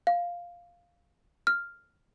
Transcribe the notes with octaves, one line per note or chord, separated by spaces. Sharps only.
F5
F6